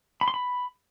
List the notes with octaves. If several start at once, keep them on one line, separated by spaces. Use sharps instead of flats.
B5
C6
B5